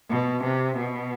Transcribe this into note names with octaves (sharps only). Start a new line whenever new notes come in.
B2
C3
B2